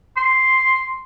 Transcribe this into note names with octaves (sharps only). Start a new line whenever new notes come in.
C6